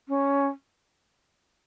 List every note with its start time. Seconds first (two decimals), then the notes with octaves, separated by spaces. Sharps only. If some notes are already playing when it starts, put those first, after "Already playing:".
0.08 C#4